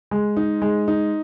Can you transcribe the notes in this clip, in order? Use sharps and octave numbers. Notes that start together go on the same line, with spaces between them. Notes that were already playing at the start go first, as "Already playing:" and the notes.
G#3
D#4
G#3
D#4